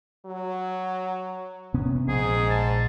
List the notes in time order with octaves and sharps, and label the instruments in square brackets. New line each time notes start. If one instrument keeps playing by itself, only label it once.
[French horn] F#3
[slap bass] C3 B3 C#4
[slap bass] A#1 F3 [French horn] G#2 [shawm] G#4
[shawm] A5